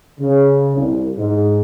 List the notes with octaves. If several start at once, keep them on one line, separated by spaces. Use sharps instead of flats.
C#3
C2
G#2